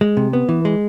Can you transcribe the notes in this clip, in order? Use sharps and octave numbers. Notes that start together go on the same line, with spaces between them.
G#3
C3
B3
E3
G#3